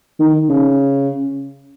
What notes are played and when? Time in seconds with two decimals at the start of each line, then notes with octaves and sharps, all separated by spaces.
0.19 D#3
0.49 C#3